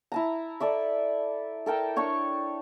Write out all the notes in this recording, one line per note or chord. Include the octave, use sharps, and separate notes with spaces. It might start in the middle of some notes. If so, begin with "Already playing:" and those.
E4 A5 A#5
A4 D5 E5
A4 A#4 G5 A5
D4 C#5 A5 C#6